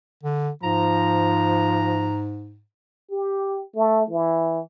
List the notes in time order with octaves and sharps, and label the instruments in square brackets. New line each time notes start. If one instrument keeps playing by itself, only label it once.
[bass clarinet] D3
[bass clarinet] G#2 [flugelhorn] F3 [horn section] A#5
[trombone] G4
A3
E3